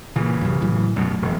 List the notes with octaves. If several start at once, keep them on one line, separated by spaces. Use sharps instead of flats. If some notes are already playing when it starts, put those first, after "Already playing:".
A#2 C#3 E3
F#2 C3
A2 F#3
F#2 B2 F#3 A3
E1 F2